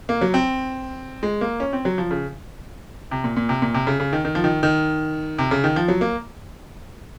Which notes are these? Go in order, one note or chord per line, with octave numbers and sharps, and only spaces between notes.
A#3
F#3
C4
G#3
A#3
C#4
C4
F#3
F3
C#3
C3
A#2
A#2
C3
A#2
C3
C#3
C#3
D#3
D#3
F3
D#3
D#3
C3
C#3
D#3
F3
F#3
A#3